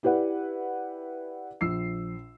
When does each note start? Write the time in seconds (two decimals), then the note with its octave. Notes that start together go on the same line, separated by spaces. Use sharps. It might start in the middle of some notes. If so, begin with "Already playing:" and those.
0.03 E4 G4 B4 D5 F#5
1.61 A#1 E6 C7